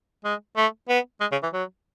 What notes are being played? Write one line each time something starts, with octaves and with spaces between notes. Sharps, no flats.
G#3
A3
B3
G#3
C#3
E3
F#3